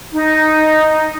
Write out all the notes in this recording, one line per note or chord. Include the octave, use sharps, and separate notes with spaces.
D#4